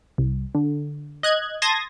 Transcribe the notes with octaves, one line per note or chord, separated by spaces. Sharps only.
C2
D3
D#5 F#6 G#6
A5 C6 D#6 G#6 A#6